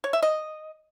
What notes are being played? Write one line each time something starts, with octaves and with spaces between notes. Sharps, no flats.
C#5
E5
D#5